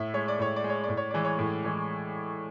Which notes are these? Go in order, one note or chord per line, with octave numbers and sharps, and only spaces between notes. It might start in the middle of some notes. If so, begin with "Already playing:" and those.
Already playing: A2 E5
G#3 C#5
D5
A2 C#5
D5
G#3
C#5
A2 D5
C#5
E3 G#3 D5
C#5
A2
E3 G#3